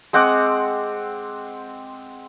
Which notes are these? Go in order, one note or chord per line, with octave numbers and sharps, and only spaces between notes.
G#3 C4 F#5 D6